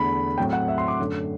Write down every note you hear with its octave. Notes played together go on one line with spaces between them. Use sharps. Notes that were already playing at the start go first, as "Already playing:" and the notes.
Already playing: E2 D3 A3 B5
A2 F#3 C4 G5
F#5
E5
C6
D6
F#2 D3 A3